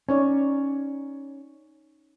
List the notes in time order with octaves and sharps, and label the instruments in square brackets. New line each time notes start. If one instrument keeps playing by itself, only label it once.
[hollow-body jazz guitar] C#4 [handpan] D#4 C#5 D5